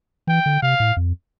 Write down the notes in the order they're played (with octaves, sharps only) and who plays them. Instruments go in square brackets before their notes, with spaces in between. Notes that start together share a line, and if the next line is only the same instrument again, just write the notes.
[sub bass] E3 [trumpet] G5
[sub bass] D3
[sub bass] C3 [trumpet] F5
[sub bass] A2
F2